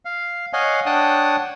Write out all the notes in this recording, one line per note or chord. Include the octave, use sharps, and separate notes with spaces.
F5
C#5 D#5 F5 F#5 G#5
D4 C#5 F#5 G5 A5 D#6